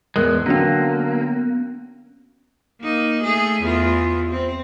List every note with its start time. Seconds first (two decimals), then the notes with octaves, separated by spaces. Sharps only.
0.16 E2 A2 G#3 A#4 F#6
0.46 D3 F#3 A#3 B3 C#4
2.82 A#3 D#4
3.23 A3 G#4
3.62 E2 F4
4.31 C4